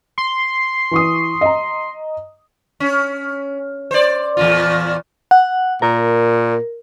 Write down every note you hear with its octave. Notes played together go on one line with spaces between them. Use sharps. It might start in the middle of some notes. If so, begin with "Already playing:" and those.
C6
E3 C#6 D#6
D#5 A#5
C#4
C5 D5
E2 A#2 F4
F#5
A#2 A#4